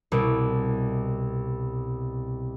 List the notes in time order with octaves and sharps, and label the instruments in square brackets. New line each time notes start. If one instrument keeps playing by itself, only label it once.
[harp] C2 B2 D6